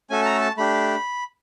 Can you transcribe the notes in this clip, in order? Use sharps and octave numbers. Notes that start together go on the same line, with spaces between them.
A3 C#4 F#4 A4 G#5
A5
A#5
A5
A3 D4 G4 B5